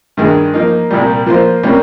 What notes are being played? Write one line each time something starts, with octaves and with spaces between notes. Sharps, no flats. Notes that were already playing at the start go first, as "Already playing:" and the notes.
G2 D#3 G#3
F3 A#3 D#4
C2 A#2 G3
F3 A#3 F4 C5
C3 G3 A#3 C#4